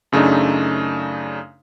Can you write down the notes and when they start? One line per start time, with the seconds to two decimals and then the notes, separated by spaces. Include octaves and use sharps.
0.12 F#2 C#3 A3 D4 D#4